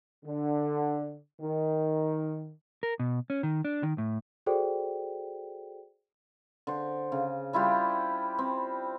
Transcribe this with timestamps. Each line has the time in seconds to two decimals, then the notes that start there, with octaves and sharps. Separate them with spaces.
0.24 D3
1.41 D#3
2.83 A#4
3.00 B2
3.30 C#4
3.43 D#3
3.65 D4
3.83 D#3
3.98 A2
4.46 F#4 G#4 A4 C5 D5 G5
6.67 D3 C5
7.12 C#3
7.53 G3 E4 F4 G4
8.38 C4